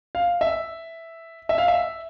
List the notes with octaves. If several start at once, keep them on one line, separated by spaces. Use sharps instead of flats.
F5
E5
E5
F5
E5